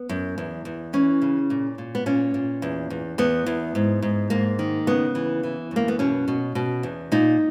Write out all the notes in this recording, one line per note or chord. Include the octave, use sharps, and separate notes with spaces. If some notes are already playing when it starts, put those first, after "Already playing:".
Already playing: B3
F#2
E2
E2
E3 C#4
C#3
A#2
A#2
B3
A#2 C#4
A#2
E2
E2
E2 B3
E2
G#2
G#2
G#2 A#3
D#3
C#3 B3
E3
E3
F#2 A#3
B3
B2 C#4
B2
B2
E2
A#2 D#4